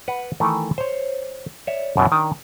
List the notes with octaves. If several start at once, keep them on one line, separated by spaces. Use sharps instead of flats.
B4 F#5
D#3 E3 A3
C5 C#5
C#5 D5 E5
F#2 B2 E3
D#3 D4